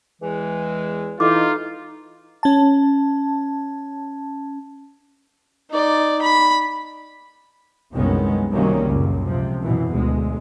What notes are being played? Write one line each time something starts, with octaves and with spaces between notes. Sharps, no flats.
E2 E3 G#3
E3 D#4 F4 A4 D6
C#4 A5
D#4 D5
B5
C2 F#2 D#3 G#3 B3 C#4
C3 D#3 F#3 G3 A#3 C#4
C#2 F#2 A#2
C3 F3
F#2 B2 E3
D2 G#3